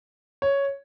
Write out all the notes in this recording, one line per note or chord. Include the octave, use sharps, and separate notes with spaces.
C#5